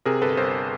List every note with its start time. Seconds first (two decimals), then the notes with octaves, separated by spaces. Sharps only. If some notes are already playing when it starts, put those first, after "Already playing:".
0.05 C3 G#4 A#4
0.21 G1 A4 B4
0.37 G1 A#4 C5